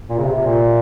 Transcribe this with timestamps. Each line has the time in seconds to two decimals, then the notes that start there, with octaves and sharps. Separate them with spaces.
0.10 A#2
0.19 C#3
0.24 C3
0.40 A#2